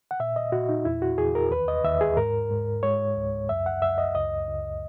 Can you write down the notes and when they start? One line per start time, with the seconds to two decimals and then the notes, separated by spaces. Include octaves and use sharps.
0.11 F#5
0.20 A#2 E5
0.36 D#5
0.52 A#2 F#4
0.69 D#4
0.85 E2 E4
1.02 F#4
1.18 E2 G#4
1.35 A#4
1.51 D#2 B4
1.68 D#5
1.84 D#2 E5
2.01 G#4
2.17 G#2 A#4
2.50 G#2
2.83 G#3 C#5
3.16 C#2
3.49 F#2 E5
3.66 F#5
3.82 F#2 E5
3.98 D#5
4.15 C#2 D#5
4.48 C#2